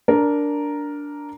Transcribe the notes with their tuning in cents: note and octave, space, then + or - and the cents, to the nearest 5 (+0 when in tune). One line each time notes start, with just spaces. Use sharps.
D4 -10 A#4 +0